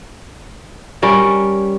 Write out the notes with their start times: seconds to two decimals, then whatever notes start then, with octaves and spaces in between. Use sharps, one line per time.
1.02 G3 C#4 A#4 C#5